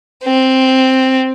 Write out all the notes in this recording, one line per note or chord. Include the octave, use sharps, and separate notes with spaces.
C4